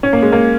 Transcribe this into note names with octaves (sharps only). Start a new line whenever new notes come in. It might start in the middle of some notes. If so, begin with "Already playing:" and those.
C#4
A#3
G#3
A#3